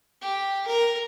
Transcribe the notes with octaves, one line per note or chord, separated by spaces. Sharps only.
G4
A#4